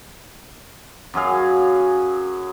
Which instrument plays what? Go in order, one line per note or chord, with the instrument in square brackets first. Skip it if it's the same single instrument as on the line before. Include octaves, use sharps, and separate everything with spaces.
[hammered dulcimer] F#2 F#3 G#4 F5